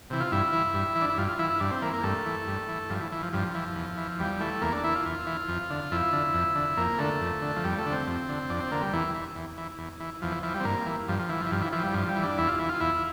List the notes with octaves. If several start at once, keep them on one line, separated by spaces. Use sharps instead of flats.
C3 E3
F4
G2 E4
E3
G2
E3
D4
E4
G2 F4
F4
E3 E4
E4
G2 D4
C4
E3 A#3
A#3
G2 A3
E3
G2
E3
G2 F3
E3
E3
F3
G2 F3
E3
E2
E3
E2 G3
E3 A3
E2 A#3
D4
E3 E4
F4
E2
E3
F2
D3
F2 E4
D3
F2
D3
F2 A#3
D3 A3
F2
D3
F3
F2 G3
A3
D3
C4
F2
D3
F2 D4
C4
D3 A#3
G3
E2 E3
E3
E2
E3
E2
E3
E2 F3
E3
E3 F3
G3
C4
G2 A#3
E3
G2 F3
F3
E3
F3
E3
G2 F3
E3
E3 F3
G3
G2 F3
G3
E3
D4
E2 E4
F4
E3
F4
E2 E4